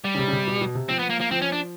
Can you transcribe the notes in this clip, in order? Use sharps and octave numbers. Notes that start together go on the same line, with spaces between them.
G3
C#3
C3
C#3
C3
B2
B2
C3
F3 C4
B3
A#3
A#3
F3 C4
C#4
D4